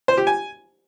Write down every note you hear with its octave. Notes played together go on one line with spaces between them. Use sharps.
C5
G4
G#5